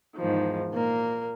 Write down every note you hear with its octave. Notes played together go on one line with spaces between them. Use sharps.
E2 G#2 D#3 F3
A#2 A#3